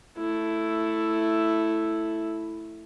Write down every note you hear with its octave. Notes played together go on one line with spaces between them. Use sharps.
A3 E4